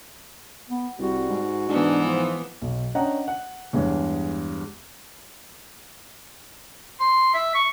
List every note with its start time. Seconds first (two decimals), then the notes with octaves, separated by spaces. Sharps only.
0.69 B3
0.99 C2 G3 F#4
1.29 G#2
1.69 G#2 E3 B3 D4
2.04 F3
2.62 B1
2.95 C#4 D4 D#5 F#5 G5 A#5
3.28 F#5
3.73 E2 G2 G#3 C#5
7.00 C6
7.34 E5
7.55 C#6